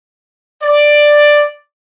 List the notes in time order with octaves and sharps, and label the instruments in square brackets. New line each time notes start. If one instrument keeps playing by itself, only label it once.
[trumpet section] D5